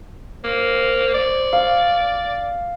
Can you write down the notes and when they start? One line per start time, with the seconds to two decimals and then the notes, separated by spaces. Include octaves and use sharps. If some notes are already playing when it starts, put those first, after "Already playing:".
0.44 A#3 C5
1.14 D5
1.53 F5